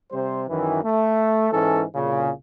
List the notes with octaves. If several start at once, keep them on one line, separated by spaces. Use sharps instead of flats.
C3 G3 C5
F#2 D#3 E3
A3
G#2 E3 C#4 A4
C2 A#2 C#3